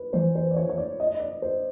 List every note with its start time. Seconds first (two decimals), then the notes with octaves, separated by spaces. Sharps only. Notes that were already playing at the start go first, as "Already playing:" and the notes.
Already playing: B4
0.13 E3 C5
0.35 C5
0.51 D5
0.57 C#5
0.69 C#5
0.78 D5
1.00 D#5
1.10 D#5
1.20 D5
1.42 C5